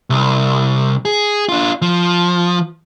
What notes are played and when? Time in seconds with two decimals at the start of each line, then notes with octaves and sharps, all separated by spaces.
0.10 C2
1.05 G#4
1.49 D4 F4
1.82 F3